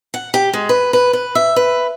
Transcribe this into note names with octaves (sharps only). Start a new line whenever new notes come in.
F#5
G4
G#3
B4
B4
B4
E5
B4